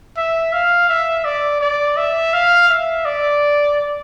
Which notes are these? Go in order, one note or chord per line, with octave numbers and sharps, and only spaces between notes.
E5
F5
E5
D5
D5
E5
F5
E5
D5